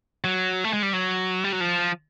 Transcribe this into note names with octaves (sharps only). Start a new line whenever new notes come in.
F#3
A3
G#3
G3
F#3
G3
F#3
F3